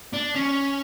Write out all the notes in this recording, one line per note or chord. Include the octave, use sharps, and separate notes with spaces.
D4
C#4